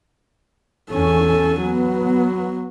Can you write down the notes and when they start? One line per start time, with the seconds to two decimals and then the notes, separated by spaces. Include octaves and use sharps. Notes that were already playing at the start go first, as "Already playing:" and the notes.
0.92 E2 C#4 A4 G#5
1.61 F#3 B3